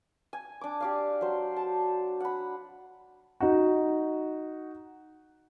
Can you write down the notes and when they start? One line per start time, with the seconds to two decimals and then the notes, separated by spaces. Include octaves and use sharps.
0.33 G#5
0.61 D4 D6
0.80 G4 D5 F5
1.21 F#3 C5
1.56 A5
2.20 F#5 B5
3.41 D#4 F#4